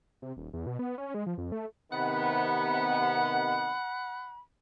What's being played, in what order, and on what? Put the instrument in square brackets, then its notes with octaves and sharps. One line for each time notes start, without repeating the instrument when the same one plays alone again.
[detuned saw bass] C3
D#1
E2
B2
B3
C#4
G#3
F3
F2
A3
[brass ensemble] C3 D#3 B3 [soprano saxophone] F#5 [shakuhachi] B5